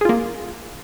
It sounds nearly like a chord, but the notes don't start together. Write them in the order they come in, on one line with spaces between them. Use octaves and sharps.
G#4 F4 A#3